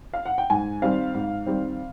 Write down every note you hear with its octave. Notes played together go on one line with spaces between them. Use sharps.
F5
F#5
G5
G#2 G#5
D#3 G3 C4 F5
G#2
D#3 G3 C4